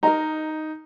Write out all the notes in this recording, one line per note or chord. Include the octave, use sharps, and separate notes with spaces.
D#4 A#4 D#5 A#5